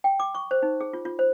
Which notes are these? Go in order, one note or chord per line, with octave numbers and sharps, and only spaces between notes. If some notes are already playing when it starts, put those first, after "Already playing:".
G5
D6
C#6
C5
D#4
G#4
F4
F4
C5